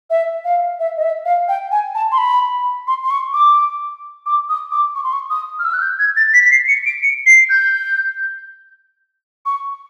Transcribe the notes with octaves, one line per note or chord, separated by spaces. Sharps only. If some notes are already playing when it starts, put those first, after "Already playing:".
E5
F5
E5
D#5
E5
F5
G5
G#5
A5
C6
B5
C6
C6
C#6
D6
D6
D#6
D6
C#6
C6
C#6
D#6
F6
E6
F#6
G6
G#6
A6
B6
B6
C7
C#7
D7
C#7
C7
G6
C#6